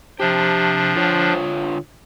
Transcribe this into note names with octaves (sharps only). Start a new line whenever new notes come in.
C3 F3 D4 G4
D3 F4 C#5